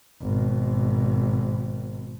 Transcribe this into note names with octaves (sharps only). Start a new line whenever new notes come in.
G#1 B2